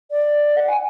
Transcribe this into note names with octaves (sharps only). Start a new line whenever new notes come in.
D5
F#5
G#5